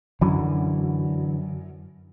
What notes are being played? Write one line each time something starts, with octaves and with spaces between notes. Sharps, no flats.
F#2 D3 E3 F#3